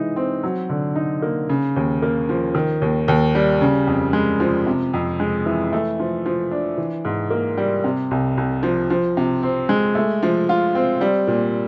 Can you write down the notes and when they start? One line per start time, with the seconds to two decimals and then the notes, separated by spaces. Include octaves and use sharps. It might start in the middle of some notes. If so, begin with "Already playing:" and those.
Already playing: E3 G#3 D#4
0.16 C4
0.43 F#3
0.70 D3
0.96 D#4
1.22 A#3
1.49 C#3
1.76 D#2
2.02 A#3
2.29 F3
2.55 D#3
2.82 D#2
3.08 D#2
3.35 G3
3.61 C#3
3.87 F2
4.13 G#3
4.40 F3
4.66 C3
4.94 F2
5.20 G#3
5.46 E3
5.73 A3
5.99 F3
6.26 F3
6.51 D4
6.78 E3
7.05 G#2
7.31 A#3
7.57 G3
7.84 C3
8.11 C2
8.37 C2
8.63 F3
8.90 F3
9.17 C3
9.43 C4
9.69 G#3
9.95 A3
10.23 F3
10.49 F4
10.75 C4
11.01 G3
11.27 A#2